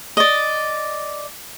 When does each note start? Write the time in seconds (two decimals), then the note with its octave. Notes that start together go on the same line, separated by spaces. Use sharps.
0.17 D5 D#5